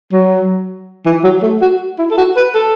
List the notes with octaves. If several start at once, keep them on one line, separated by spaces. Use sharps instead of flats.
F#3
E3
F#3
A3
F#4
E4
A4
F#4
B4
A4